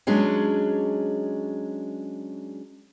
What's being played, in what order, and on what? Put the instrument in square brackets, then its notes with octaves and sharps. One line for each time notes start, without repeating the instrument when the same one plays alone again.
[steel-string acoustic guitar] F#3 G#3 C#4 D4